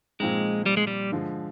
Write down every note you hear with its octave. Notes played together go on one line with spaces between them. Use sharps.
A#2 F3 G#3 C4 D#4
G3
G#3
G3
D3 F3 G#3